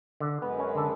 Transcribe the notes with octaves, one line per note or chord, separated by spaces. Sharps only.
D3
F#2 G#3 B3 B4
C#4
D3 A4